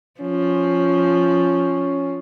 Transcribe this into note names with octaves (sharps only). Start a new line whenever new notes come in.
F3 C#4